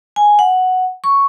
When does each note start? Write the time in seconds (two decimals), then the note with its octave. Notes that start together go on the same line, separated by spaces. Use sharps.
0.16 G#5
0.39 F#5
1.04 C#6